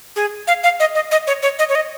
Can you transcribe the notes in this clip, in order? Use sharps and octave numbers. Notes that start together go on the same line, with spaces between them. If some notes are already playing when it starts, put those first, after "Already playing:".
G#4
F5
F5
D#5
D#5
D#5
C#5
C#5
D#5
C#5
D#5